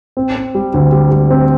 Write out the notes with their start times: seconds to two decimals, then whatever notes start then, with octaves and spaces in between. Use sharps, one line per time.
0.17 C4
0.36 C4
0.55 G3
0.74 D2
0.92 G3
1.11 G3
1.30 C4